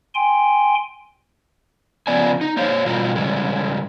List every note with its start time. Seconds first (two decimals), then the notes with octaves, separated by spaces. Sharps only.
0.15 G5 G#5 C6
2.07 C#3 F3 B3 D5 G#5
2.41 D#4
2.57 A#3 C5 C#5 F5
2.86 B2 E3 G3 F4 A#4
3.15 C#3 E3 G3 G#3